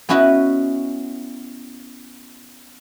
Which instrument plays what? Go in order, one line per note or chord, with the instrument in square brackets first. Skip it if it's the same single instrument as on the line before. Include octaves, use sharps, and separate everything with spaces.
[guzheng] B3 C#4 E4 F#4 B4 D#5